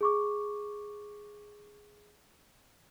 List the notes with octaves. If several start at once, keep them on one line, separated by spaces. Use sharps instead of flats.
G#4 C#6 D6